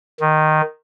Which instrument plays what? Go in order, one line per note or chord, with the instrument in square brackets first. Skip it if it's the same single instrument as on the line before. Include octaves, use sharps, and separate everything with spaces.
[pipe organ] D#3